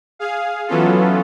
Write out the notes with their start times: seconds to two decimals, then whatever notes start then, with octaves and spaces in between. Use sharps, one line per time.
0.19 G#4 F5
0.67 E3 F#3 B3 C#4 F4 A4